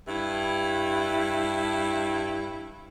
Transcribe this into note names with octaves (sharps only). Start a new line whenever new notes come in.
G2 E4